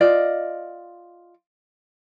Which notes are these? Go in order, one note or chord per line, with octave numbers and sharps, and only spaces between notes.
F4 D5 D#5